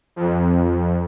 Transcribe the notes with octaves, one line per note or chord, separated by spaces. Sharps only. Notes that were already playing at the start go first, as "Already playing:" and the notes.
F2